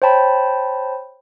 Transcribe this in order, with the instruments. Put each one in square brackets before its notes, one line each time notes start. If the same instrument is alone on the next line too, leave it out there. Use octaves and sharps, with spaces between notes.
[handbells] C5 C#5 G5 A5 B5